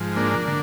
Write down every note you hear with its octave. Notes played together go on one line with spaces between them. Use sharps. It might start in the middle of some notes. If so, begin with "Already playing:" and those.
Already playing: G#2 F3
A#3 D4
D3